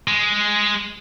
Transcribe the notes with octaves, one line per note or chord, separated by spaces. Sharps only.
G#3